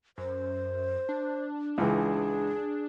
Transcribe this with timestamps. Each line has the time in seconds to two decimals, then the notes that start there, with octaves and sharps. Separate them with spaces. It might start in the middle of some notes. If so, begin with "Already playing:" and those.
0.18 F#2 C5
1.09 D4
1.78 C#2 E3 G#4